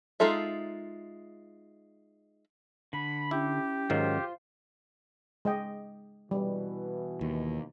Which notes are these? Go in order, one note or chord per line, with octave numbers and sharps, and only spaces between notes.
G#3 D#4 F4 A4 E5
D3 B5
C#4 E4 G4
G#2 D#3 F#3 F4 C5
G#3 D#5 G5
B2 E3 G3
D#2